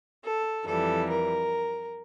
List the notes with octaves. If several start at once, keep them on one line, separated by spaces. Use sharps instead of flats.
A4
F2 E3 G3 A4
A#4